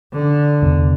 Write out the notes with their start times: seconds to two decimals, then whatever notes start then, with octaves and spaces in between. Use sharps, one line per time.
0.13 D3
0.62 E2 C3 B3